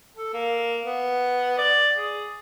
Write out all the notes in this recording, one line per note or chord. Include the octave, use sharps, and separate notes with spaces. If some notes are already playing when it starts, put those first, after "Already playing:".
A4
A#3
B3
D5
G#4